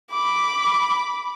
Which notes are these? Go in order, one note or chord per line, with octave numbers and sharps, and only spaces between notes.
B5 D6